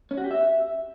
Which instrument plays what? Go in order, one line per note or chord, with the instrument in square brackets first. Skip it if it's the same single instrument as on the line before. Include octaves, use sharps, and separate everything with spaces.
[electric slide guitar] C#4
F#4
G4
E5